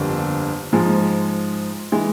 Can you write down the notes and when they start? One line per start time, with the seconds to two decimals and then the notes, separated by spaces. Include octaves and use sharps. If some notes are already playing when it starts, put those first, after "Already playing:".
Already playing: G1 F2 D3 G3 A#3
0.72 G#2 F3 G#3
1.92 E3 G#3